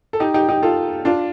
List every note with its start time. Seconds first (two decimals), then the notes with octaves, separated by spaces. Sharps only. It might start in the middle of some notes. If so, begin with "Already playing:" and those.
0.13 A4
0.20 D#4 G4
0.34 D#4 G4
0.49 D#4 G4
0.63 F4 A4
1.05 D4 F4